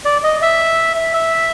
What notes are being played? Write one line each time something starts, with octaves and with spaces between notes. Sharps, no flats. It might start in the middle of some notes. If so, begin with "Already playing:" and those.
D5
D#5
E5
E5